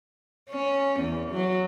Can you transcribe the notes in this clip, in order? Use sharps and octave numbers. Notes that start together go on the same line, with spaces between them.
C#4
E2
F#3